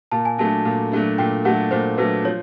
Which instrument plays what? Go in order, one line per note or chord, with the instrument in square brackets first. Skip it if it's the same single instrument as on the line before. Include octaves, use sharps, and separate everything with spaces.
[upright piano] A#2 [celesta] A5
[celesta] G#5
[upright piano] F#3 A3 D4 [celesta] A5
[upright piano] A#2
F#3 A3 D4
[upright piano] A#2 [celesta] G5
[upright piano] F#3 A3 D4 [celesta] F#5
[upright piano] A#2 [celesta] C5
[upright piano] F#3 A3 D4 [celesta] B4
[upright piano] F3 [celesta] C#5